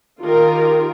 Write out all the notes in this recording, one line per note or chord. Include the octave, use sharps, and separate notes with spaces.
D#3 F4 G4 A#4